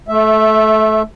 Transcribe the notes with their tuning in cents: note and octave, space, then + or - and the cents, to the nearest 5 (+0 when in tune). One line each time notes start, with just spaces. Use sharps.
A3 -20 E5 +0